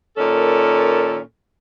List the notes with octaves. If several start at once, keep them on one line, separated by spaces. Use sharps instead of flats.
A#2 D#3 C#4 A4